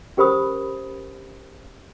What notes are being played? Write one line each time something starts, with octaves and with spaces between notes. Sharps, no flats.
C#4 G4 A#4 C5 B5 D#6